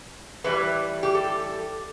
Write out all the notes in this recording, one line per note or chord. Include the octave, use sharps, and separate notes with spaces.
A2 E3 G3 B4
G4
A4